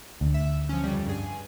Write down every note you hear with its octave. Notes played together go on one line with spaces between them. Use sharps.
D2
E5
F3 C#4
F2 C#3 G3
G2 G#4 G#5